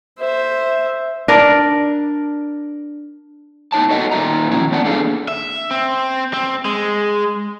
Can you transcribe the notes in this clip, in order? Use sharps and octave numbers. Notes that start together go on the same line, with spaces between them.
C5 E5
D4 A#4 D5
A2 B3 D#4 C#5 A5
F#4 A4 D#5 E5 F#5
A#2 D#3 F4 G#4 E5 A#5
D#3 F3 C#4 E4 F#4
B3 D4 F#5
A#3 D4 G#4 A4 F5
E5
C4
C4
G#3